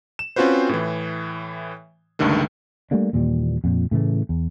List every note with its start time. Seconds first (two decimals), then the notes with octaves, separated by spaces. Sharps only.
0.19 E7
0.36 C4 C#4 F4 F#4 B4 C5
0.69 A2 E3
2.19 C#2 G2 D3 D#3 A3
2.91 G3 A3 A#3 D4
3.13 D#2 A#2 E3 G3
3.64 F2 A#2
3.91 A2 C#3 E3 A3
4.29 E2